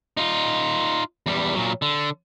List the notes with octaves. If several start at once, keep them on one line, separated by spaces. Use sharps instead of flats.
D#4 F4
E2 G3
A#2 F#3
D3